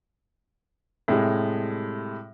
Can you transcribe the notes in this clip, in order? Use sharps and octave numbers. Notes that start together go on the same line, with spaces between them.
A2 C3 G3 G#3